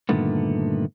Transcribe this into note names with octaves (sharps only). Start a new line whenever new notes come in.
G2 A#2 D3 D#3 A3 B3